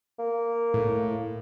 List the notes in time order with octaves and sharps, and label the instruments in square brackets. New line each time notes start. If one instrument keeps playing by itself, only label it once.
[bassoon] A#3
[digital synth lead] A2